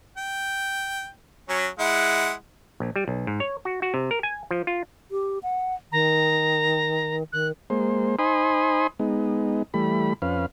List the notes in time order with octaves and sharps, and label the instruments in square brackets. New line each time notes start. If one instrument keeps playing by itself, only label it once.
[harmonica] G5
F#3 C#4
G#3 E4 F#5
[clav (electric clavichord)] A#1
G3
B1
G#2
C#5
F#4
F#4
C3
A#4
G#5
F3
F4
[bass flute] G4
F#5
[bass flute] D#3 [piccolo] A#5
[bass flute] D#3 [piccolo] F#6
[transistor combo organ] G#3 A#3 C5
D#4 C5 G#5 B5 C6 D#6
G#3 B3 D#4
E3 G3 A3 B5
F2 C#4 B4 F5